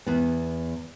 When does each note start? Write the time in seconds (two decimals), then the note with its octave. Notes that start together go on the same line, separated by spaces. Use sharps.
0.07 E2 B3